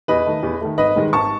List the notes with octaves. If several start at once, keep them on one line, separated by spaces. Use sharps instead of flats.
E2 B4 D#5
D#3 A3
E2
D#3 A3
G#1 B4 D#5
G#2 D#3 G#3
G#1 A5 C#6